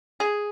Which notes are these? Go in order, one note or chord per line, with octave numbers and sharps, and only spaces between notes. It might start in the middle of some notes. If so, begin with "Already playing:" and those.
G#4